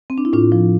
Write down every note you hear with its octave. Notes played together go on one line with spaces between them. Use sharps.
C4
D4
E4
A2 D4 F4
F3